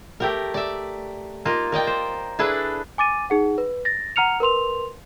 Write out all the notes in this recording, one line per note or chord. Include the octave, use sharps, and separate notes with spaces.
A3 G4 A#4
D5 E5
A#3 D#4 F4
A#4 D5 D#5 G5
C5
D4 E4 G#4 A4 B4
G#5 D6 A6 D#7
D#4 G#4 F#5
B4
A6 A#6
F#5 A#5 F6 C#7 F7
A#4 B4 C6 F7